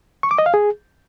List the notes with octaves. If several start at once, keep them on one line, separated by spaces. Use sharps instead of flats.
C#6
D6
D#5
F5
G#4